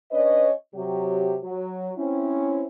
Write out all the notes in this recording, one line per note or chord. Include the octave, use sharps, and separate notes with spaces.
C#4 D4 B4 C#5 D#5
C3 F#3 G4
F#3
C4 C#4 E4